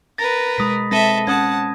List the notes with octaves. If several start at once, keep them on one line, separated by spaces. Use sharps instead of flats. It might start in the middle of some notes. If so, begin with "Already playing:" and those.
A#4 B4 A6 A#6
B2 G#3 B5 D#6 B6
G#3 C4 A4 B4 E5 A#6 D#7
C#4 F#5 A5 D#6 G#6